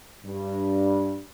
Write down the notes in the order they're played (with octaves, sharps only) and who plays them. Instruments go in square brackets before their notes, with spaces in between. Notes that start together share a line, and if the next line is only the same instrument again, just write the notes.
[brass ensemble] G2